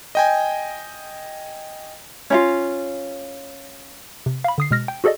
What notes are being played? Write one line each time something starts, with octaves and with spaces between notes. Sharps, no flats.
D#5 G5 G#5
C#4 E4 F4
C3
F5 B5
D3 D#6 C7
B2 G#3 F6 A#6
G5
F#4 G#4 A4 D5 D#5